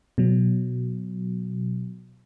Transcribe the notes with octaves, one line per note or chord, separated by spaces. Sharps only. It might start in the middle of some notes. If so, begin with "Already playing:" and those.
B2 F#3